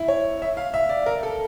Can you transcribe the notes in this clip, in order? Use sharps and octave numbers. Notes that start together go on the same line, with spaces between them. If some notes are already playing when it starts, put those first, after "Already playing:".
Already playing: E4
C#5
E5
F5
E5
D5
A#4
A4